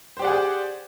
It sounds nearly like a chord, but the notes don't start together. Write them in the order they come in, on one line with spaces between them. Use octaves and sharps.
C5 G4 D5 F#5 G#4